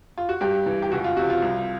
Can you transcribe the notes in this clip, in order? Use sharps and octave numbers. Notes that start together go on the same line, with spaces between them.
F4
F#4
G2 G4
E3
G4
C#2 F#4
F4
C3 F3 F#4
F4
C2